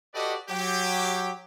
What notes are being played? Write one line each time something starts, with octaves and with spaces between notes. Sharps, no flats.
F#4 G4 A4 B4 D5 D#5
F#3 G4